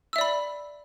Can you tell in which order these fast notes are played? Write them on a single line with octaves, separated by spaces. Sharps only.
E6 E5 D5 B5